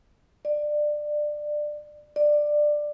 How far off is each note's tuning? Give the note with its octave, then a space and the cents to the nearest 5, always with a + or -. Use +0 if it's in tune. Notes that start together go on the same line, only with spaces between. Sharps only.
D5 +20
D5 +15